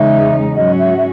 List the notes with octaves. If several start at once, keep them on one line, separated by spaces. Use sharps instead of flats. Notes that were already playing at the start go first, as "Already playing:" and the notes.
Already playing: E2 C#3 G#3 D#4 E5
G#2 F#3 C#4 F#4 D#5
E5
E5